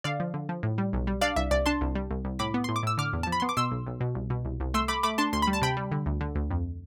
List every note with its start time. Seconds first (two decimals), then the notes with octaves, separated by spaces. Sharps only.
0.04 D3 D5 F5
0.20 F3
0.34 D3
0.49 F3
0.63 A2
0.78 G3
0.93 B1
1.07 G3
1.21 D4 D5 F5
1.36 C2 E5
1.51 C2 D5
1.66 D4 A5 C6
1.81 C2
1.95 G3
2.11 C2
2.25 C2
2.39 A2 B5 D6
2.54 B3
2.64 A2 C6
2.76 D6
2.83 A2 E6
2.98 D3 D6 F6
3.13 E2
3.23 A5
3.27 F3
3.32 B5
3.40 B3 C6
3.49 D6
3.57 B2 C6 E6
3.71 B1
3.87 B1
4.01 B2
4.15 C2
4.30 B2
4.45 C2
4.60 C2
4.74 A3 C6 E6
4.88 A3 B5 D6
5.03 A3 B5 D6
5.18 D4 A5 C6
5.33 D2 C6
5.42 B5
5.47 G3
5.53 A5
5.62 C3 G5 B5
5.77 G3
5.92 D3
6.06 D2
6.21 D3
6.35 D2
6.51 F2